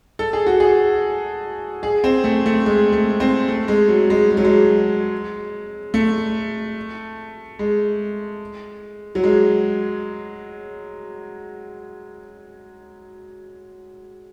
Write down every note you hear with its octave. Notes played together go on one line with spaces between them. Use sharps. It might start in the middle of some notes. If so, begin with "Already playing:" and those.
A4
G#4
F#4
G#4
G#4
C4
A3
A3
G#3
A3
C4
A3
G#3
F#3
G#3
G#3
F#3
G#3
A3
G#3
F#3
G#3